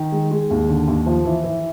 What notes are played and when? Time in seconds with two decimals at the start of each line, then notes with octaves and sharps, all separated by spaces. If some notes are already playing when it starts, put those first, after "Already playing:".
Already playing: D#3
0.12 G#3
0.31 G#3
0.50 D#2
0.69 D3
0.88 D#2
1.06 F3
1.25 E3
1.44 E3